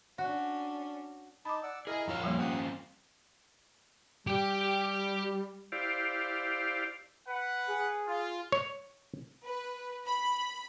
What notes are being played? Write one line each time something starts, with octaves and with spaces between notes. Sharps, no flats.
C#4 D4 F#4
D#4 A5 B5 D6
D5 F#5 E6
E4 G#4 A#4 D#5 G#5 A#5
F2 F4 C#5 F5 C6 E6
F3 G3 A#3
C4 C#4 F4 G4 F#5 D#6
G3 G4 G5
E4 G4 C5 D5 F5
B4 F#5
G#4
F4
C#5
B4
B5